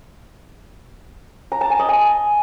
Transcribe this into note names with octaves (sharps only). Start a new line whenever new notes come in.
A#5
A5
G#5
D#5
G#5